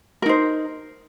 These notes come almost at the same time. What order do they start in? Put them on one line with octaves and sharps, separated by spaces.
A#4 D#4 C5